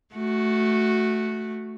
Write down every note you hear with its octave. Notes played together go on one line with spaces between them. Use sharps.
A3 F#4